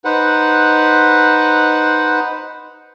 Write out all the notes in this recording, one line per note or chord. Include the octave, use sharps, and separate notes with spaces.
D#4 B4 C5 F#5